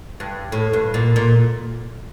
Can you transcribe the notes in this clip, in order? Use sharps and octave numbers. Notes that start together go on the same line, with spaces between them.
G2
A2
G2
A#2
A#2